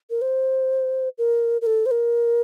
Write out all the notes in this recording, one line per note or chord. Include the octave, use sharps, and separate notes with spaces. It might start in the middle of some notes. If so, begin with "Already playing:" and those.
A#4
C5
A#4
A#4
A4
C5
A#4